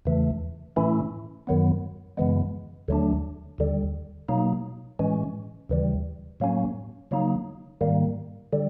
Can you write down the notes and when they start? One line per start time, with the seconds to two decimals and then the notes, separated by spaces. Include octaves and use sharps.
0.05 E2 C#3 E3 A3
0.76 A2 E3 A3 C#4 E4
1.47 F#2 D#3 F#3 B3
2.17 F#2 C#3 E3 G#3 B3
2.88 D#2 D3 F#3 A3 D4
3.58 D#2 D3 G3
4.28 B2 F#3 A#3 D#4
4.99 A2 E3 G#3 C#4
5.69 D#2 C#3 E3 G3
6.40 A2 F#3 A#3 C#4
7.11 C#3 F#3 A#3 D#4
7.81 G#2 D#3 G3 A#3
8.53 D3 G3